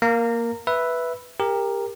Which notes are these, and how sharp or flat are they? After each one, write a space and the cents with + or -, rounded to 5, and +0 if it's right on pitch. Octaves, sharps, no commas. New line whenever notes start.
A#3 +0 F5 +0 A#5 -20
B4 +0 E5 +0
G4 +25 A#4 +0